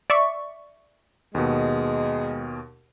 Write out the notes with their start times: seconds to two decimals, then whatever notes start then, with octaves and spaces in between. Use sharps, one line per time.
0.10 D5 E5 C#6
1.35 D#2 B2 G#3